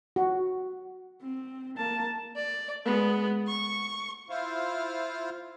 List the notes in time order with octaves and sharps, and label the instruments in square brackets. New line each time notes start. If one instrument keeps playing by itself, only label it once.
[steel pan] F#4
[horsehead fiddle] C4
A#3 A5
[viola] D5
G#3 B3
C#6
[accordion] E4 F4 C5 F5